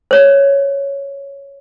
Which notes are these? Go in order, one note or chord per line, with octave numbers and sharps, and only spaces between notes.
C5 C#5